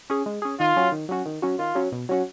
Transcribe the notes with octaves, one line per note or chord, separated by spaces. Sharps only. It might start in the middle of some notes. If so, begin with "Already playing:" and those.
C#4 G#4
G#3
C#4 G#4
D#3 F4
F#3 C#4 F#4
D#3
F#3 C#4 F#4
D#3
F#3 C#4 F#4
D#3 F4
F#3 C#4 F#4
B2
F#3 C#4 F#4